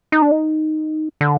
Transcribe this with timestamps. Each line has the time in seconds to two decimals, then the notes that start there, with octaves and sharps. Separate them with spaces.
0.12 D#4
0.22 D4
0.31 D#4
1.21 D3